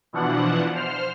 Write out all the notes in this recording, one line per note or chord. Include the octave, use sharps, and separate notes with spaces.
B2 E3 F3 D4 F#5
C5 F6